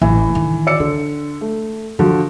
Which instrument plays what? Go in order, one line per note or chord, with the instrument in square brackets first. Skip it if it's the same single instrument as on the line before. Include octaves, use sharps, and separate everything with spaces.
[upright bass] A1 [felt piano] E3
[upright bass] D3 D#3
[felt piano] D5 E6 C#7
[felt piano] D3 [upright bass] D4
[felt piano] A3
[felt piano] D3 F3 F#4 [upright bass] E3